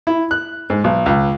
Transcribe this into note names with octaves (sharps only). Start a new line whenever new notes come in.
E4
F#6
G#2
B1
C#2